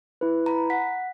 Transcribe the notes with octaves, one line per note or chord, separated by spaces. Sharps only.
E4 B4
A#5 B5
F#5 B6